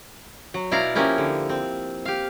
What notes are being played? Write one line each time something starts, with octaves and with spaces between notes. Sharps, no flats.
F#3
B2 E4 D5 F5 A#5
F3 A#3 C#4 E4 G4
D3
C4
G4 F5